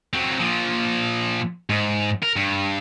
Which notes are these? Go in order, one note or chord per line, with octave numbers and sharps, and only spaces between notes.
F#3 C4
A#2 F3
G#2
A#4
G2